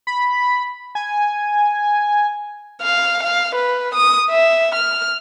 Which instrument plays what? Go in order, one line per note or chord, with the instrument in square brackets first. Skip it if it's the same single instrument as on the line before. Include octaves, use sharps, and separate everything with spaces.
[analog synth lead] B5
G#5
[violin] F5
F5
B4
D#6
E5
F6